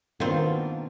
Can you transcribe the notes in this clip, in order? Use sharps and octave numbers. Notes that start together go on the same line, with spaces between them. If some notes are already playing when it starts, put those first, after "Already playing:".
B2 D#3 A#3 C4 D4 F4